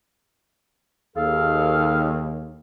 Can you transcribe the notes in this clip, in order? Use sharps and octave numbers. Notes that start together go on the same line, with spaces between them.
D#2 G#4 A4 F5